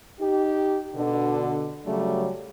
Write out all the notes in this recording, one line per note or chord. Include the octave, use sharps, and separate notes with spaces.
D#4 G4
B2 D3
C#3 F#3 G3 A3